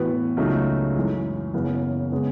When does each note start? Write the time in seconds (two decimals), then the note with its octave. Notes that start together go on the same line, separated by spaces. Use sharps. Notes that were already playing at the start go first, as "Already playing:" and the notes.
Already playing: A2 E3 B3 F#4 B4
0.37 C#2 C#3 F#3 A3 D#4
0.95 F#2 E3 G#3
1.53 F#1 F#2 C#3 E3 B3
2.12 C#3 G#3 B3